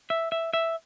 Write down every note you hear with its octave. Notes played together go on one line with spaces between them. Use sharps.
E5
E5
E5